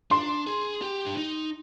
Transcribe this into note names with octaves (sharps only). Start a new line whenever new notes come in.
D4 C6
G#4
G4
D4
D#4